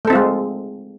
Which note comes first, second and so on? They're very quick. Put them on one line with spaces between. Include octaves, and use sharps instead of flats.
A3 A4 C4 F4 G#3